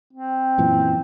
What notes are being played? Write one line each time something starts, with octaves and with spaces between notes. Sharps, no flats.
C4
F#2 A#2 E3